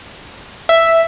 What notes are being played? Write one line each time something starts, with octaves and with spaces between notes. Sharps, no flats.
E5